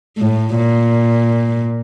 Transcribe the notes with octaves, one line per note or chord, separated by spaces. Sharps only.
A2
A#2